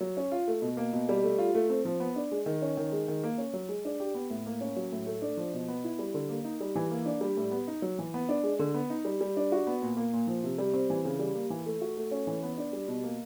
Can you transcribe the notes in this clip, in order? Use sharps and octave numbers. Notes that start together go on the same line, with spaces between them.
F#3
C#4
F4
A3
B2
A#3
B2
G3
A3
F4
A3
C4
F3
B3
D4
G#3
D#3
C#4
D#3
G#3
D#3
A#3
C#4
F#3
G#3
D4
G4
B3
A2
A#3
C#4
F#3
A2
A3
D4
F3
B2
B3
E4
G3
D3
A#3
D#4
G3
E3
A#3
D4
G3
A2
B3
D#4
F#3
E3
B3
D4
G#3
D3
B3
D#4
G3
G3
D4
F#4
B3
A#2
A#3
A#2
F3
C3
G3
C4
E3
C#3
G3
A#3
E3
A3
F#4
A3
C#4
E3
B3
D4
G3
B2
A#3